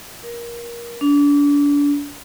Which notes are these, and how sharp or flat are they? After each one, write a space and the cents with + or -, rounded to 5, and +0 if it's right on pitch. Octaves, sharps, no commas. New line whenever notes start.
A#4 +20
D4 -35